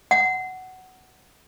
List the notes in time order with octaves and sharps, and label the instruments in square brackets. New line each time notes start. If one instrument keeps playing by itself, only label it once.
[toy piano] F#5